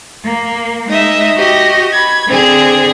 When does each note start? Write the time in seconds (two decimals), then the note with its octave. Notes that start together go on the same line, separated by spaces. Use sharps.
0.24 A#3
0.88 G#3 D#4 D#5 E5
1.37 F#4 G4 D#5 A#6
1.92 B5 G#6
2.27 D3 C4 G#4